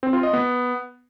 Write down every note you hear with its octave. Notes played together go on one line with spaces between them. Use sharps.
C4
F4
D#5
B3